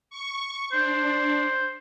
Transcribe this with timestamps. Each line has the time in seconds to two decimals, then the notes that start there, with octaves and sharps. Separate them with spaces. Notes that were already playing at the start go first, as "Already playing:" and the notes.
0.10 C#6
0.72 D4 C5